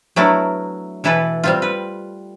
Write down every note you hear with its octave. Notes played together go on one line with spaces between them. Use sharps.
F#3 A3 B3 D4 E4 A#4
B2 E3 E4 A4 B4
G3 C4 F4
B4